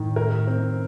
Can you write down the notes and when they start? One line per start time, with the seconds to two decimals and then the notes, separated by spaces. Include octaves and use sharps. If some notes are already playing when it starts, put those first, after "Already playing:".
Already playing: A2 D#3
0.16 A#4
0.47 C4